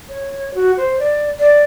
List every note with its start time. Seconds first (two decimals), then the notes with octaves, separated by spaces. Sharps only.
0.09 C#5
0.54 F#4
0.77 C5
0.99 D5
1.39 D5